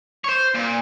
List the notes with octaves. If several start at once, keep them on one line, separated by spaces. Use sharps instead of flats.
C5 C#5
A#2